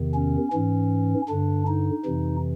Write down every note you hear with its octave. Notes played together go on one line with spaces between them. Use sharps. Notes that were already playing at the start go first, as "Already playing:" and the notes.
Already playing: E2 C3 D#3
C#4
G#2 E3 C#4
G2 D3 D4
D#4
F2 C3 E3